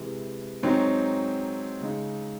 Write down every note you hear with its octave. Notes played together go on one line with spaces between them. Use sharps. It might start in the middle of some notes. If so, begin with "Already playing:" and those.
Already playing: C3 E3 G#3
G#2 F#3 C4 D#4
C#3 G#3 D#4